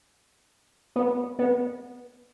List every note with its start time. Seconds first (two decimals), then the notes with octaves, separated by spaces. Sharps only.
0.96 B3
1.39 B3